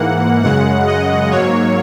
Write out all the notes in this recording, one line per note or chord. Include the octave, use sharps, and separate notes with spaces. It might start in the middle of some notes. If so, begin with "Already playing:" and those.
Already playing: G#2 E3 A#3 F#5
F#2 C#3 G#3 F#5
D#5
G#2 F#3 A#3 C#5